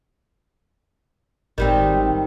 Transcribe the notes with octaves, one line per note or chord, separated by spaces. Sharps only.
G#1 D#3 G3 C4